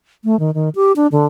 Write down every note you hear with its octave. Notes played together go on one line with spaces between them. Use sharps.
A3
D#3
D#3
G4
D4
D3